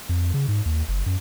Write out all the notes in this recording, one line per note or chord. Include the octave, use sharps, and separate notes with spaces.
F2
C#3
G#2
D#2
F#1
F#2